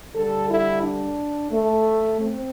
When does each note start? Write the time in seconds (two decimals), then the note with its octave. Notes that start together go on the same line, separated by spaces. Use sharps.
0.14 D3 G3 A4
0.49 E4
0.83 D4
1.52 A3
2.20 C4